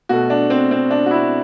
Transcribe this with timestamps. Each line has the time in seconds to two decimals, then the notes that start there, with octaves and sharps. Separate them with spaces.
0.09 B2 A3 F#4
0.30 D4
0.50 C4
0.71 C4
0.91 D4
1.06 F#4
1.11 E4